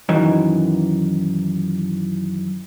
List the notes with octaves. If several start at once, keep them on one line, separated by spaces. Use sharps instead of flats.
F#2 D#3 E3